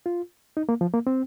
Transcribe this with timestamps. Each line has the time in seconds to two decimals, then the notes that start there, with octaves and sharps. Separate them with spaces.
0.06 F4
0.57 D#4
0.69 A#3
0.81 F3
0.93 A#3
1.07 C4